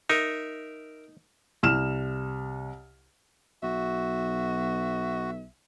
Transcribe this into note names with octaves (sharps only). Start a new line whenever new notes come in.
D#4 A#4 E5
C2 F6 E7
B1 F#4 E5